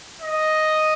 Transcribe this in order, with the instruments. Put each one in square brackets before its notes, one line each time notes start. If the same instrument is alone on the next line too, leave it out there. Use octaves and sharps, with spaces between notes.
[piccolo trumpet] D#5